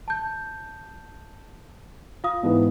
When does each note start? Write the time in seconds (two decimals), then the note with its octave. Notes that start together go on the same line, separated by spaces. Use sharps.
0.08 A5 G6
2.24 F4 F5 D#6
2.43 G#2 E3 B3